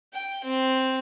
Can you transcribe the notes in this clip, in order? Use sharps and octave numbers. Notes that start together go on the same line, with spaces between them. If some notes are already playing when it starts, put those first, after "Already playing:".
G5
C4